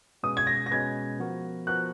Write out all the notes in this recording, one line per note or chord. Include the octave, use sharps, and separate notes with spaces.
B2 G#3 C#4 G#4 B4 D#6
G#6
A#6
A#6
B2 G#3 C#4 G#4 B4 G#6
F3 B3 F#4 A#4
F3 B3 F#4 A#4 F#6